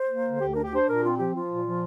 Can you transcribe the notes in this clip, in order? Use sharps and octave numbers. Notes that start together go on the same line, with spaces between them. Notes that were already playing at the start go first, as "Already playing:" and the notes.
Already playing: C5
A#3
D3
D2 G4
D4 A#4
G4
D4 C5
A#2 A#4
C4 F4
F3 G4
F3 F4
A#2
F3